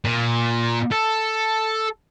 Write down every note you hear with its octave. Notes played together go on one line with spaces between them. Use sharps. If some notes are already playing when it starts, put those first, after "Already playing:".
A#2
A4